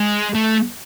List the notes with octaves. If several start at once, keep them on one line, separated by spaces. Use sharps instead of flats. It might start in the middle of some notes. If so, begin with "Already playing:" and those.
Already playing: G#3
A3